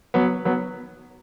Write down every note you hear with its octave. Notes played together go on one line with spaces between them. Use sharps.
F#3 B3
F#3 B3